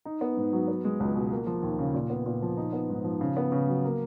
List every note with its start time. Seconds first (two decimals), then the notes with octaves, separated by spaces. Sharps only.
0.05 D#4
0.21 B3
0.37 G#2
0.52 F#3
0.68 B3
0.85 G#3
1.00 C#2
1.15 B2
1.31 A#3
1.47 F3
1.63 D#2
1.79 C#3
1.94 A#2
2.10 B3
2.26 A#2
2.42 F3
2.57 D#4
2.73 B3
2.90 G#2
3.04 F3
3.21 C#3
3.37 B3
3.52 C#3
3.68 F#3
3.84 A#3